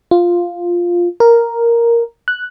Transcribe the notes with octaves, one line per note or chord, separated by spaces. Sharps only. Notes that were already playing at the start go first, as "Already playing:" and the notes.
F4
A#4
F#6